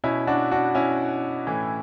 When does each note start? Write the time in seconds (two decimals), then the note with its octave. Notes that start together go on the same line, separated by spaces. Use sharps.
0.04 B2 C#4 E4
0.27 D4 F#4
0.51 D4 F#4
0.75 C#4 E4
1.47 A2 E3